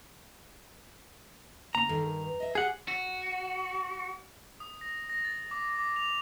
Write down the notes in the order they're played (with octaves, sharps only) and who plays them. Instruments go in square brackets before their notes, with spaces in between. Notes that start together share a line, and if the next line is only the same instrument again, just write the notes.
[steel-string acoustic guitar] C#3 [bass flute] A#3 [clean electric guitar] A#5
[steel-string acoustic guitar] G2 D#3 [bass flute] A4
[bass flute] A#4
B4
[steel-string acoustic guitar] D#5 E5
[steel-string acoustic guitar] G4 [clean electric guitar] G#4 F#5
[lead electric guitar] F#4
[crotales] D#6
A#6
A#6
A6
D6
D6
F7